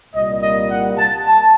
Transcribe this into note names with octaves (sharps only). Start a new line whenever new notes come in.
C2 A#2 G3 A#3 D#5
D#5
F#5
A5
A5